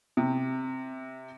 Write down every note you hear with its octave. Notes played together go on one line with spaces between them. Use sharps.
C3